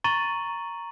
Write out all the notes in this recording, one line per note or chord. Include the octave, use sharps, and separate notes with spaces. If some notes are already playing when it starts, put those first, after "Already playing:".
A#5 C#6 A6 D#7 F#7